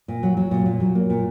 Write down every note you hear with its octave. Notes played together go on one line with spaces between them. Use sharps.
A#2
F#3
F#3
A#2
A#2
F#3
A#3
A#2